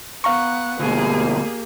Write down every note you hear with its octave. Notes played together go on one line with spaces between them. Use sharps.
B3 F5 F#5 A#5 C#6
D2 B2 A#3 G4 G#4